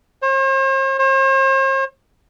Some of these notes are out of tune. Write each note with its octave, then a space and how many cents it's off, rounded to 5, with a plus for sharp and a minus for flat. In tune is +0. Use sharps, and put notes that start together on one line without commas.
C5 +45
C5 +45